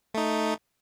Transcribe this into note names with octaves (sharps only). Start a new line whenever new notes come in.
A3 D#4